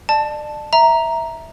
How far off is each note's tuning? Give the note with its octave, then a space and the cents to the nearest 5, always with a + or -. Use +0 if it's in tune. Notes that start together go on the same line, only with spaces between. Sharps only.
D5 +35 A5 +0
E5 -10 A#5 +0